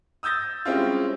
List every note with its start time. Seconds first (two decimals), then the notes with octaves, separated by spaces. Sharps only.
0.23 D#6 E6 G6 A6 A#6
0.65 G3 G#3 C4 C#4 E4 F4